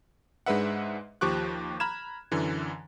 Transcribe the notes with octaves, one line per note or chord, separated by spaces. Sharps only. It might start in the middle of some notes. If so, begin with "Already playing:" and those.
G#2 G#3 D4 B4 E5 F#5
D#2 F3 G4 C#6 D6 F#6
A#5 B5 F6 G#6 E7
F#2 D3 E3